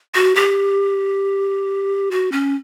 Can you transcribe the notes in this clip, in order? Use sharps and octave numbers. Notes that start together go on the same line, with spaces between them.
F#4
G4
F#4
C#4